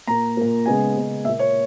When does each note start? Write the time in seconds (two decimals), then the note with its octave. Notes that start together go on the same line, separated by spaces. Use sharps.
0.07 A#2 A#3 A#5
0.37 A#2 A#3
0.66 C#3 G#3 B3 G#5
0.96 C#3 G#3 B3
1.25 A#2 E5
1.29 A#3
1.39 C#5